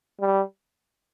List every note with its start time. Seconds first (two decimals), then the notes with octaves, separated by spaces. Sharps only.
0.20 G3